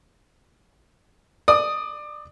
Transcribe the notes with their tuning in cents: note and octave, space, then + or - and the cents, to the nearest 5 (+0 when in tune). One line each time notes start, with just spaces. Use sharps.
D5 +25 D#6 +0